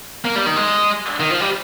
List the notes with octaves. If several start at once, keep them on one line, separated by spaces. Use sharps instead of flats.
A#3
G3
D#3
G#3
D#3
F3
G3